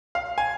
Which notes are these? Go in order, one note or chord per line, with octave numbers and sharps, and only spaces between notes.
F5
G#5